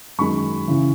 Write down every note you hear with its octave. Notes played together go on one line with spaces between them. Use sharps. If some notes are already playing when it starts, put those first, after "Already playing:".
F#2 D#3 G#3 B5 C#6
C#3 E3